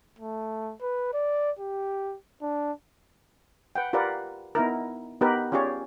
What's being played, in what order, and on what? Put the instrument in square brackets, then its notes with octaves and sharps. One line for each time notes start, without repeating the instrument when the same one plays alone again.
[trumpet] A3
B4
D5
G4
D4
[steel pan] B4 F#5 G5
F4 G4 A#4 B4 D5 F#5
B3 D#4 E4 A#4
B3 D#4 G4 A#4 B4
C#4 F4 G4 G#4 C#5 D5